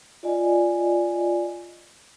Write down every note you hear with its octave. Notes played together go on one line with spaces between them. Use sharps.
F4 D5 D#5 G#5